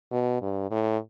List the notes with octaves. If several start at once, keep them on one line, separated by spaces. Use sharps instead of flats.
B2
G2
A2